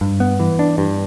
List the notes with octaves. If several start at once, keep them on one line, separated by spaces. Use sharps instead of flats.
G2
B3
E3
D4
G2